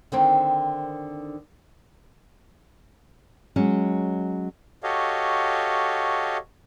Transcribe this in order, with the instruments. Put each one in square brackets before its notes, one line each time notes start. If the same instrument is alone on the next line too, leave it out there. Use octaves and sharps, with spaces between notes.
[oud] D3 D#3 C4
[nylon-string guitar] F#3 G#3 C#4
[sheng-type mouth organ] F#4 G4 A4 C#5 D#5 F5